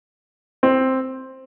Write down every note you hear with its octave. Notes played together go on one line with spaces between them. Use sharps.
C4